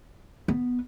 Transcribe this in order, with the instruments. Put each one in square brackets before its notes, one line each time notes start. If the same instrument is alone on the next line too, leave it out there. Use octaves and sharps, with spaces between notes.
[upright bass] B3